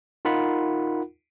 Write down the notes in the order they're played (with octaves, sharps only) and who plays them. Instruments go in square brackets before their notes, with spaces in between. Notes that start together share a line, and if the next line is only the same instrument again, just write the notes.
[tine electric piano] D#4 F4 A#4 F#5 B5